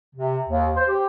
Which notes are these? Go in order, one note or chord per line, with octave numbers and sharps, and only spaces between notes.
C3
D#2
C5
G4